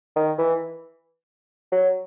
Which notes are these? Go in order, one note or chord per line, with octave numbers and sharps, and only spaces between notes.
D#3
E3
F#3